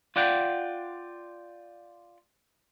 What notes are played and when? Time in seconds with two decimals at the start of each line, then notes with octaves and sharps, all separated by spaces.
0.16 F4 D5 F#5 G5